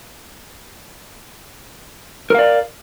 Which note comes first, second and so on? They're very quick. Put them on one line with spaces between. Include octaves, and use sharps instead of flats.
A#4 F5 D5